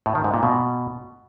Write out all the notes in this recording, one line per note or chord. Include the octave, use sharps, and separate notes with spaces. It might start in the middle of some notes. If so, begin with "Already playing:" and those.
A2
D#3
G#2
A#2
B2